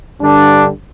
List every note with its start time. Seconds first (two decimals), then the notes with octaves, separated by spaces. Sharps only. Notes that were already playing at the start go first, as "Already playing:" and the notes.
0.21 G2 D3 G3 D4